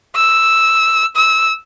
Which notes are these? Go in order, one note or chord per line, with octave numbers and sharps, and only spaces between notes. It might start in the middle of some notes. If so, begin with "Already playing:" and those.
E6
E6